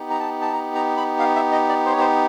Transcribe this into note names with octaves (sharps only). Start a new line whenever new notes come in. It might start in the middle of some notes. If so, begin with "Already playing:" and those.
Already playing: B3 D#4 G4
A#5
A5
A5
A#5
A#5
B5
F5
E5
D#5
D5
C5
C#5
C5